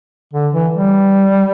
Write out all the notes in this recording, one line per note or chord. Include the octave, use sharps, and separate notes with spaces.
D3
E3
G3